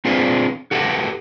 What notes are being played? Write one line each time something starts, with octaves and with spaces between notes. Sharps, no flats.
C4 D4 F4 G#4 B4 C5
F#4 G4 A4 B4 D#5 F#5